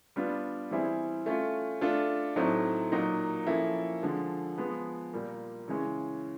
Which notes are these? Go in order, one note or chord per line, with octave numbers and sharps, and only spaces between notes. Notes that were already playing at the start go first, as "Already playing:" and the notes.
G3 B3 D4 F4
E3 G3 C4 E4 G#4
A3 C#4 F4
A3 D4 F4 A4
A2 F#3 A3 C4 D#4
A#2 F#3 A#3 D#4
F3 A#3 C#4 E4 A4
D3 F3 G#3
F3 G#3 B3
A#2 G3 A#3
C#3 E3 G#3 C#4